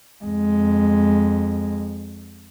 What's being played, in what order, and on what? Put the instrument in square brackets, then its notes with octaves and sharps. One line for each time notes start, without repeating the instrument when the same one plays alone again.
[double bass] F2 G#3